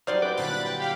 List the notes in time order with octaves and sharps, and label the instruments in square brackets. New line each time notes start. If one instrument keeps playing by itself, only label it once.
[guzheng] F#3 G3 C6 [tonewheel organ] D#4 F5 [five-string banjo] C5 D5
[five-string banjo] E4 B4 [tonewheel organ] D5 G5 D6
[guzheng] A#2 D3 [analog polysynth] B5 F#6 [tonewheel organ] A6
[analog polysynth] G5
[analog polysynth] G4 F5 G5 [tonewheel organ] B5